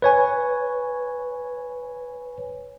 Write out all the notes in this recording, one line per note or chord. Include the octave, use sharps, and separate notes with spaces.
B4 C#5 G#5